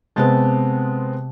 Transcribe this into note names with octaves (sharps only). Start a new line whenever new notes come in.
C3 G#3 B3 C4 A5 G6